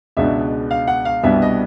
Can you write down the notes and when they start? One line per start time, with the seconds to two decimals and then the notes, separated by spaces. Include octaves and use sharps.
0.17 C#2 B2 G#3 B3 D4 E5
0.71 F5
0.88 F#5
1.05 F5
1.23 C2 B2 G3 B3 D4 E5
1.42 D#5